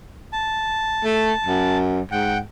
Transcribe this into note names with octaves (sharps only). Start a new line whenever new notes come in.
A5
A3
F#2
G#2 F#5 G5